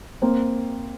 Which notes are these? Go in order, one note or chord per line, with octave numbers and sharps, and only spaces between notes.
A#3 C4